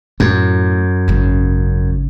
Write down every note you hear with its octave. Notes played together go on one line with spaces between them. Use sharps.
F#2 A2
G#1 C#3